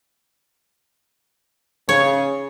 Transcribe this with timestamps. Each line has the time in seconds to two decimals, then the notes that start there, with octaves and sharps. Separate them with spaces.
1.89 C#3 C#5